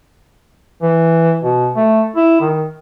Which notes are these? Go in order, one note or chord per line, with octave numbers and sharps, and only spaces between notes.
E3
B2
A3
E4
D#3